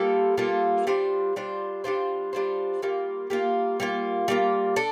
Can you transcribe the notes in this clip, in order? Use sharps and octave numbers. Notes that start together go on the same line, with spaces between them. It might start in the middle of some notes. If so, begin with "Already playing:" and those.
Already playing: G3 A#3 F4 A4
G3 A#3 F4 A4
G3 D4 F4 C5
G3 D4 F4 C5
G3 D4 F4 C5
G3 D4 F4 C5
G3 A#3 F4
G3 A#3 F4
G3 A#3 F4
G3 A#3 F4
D4 A4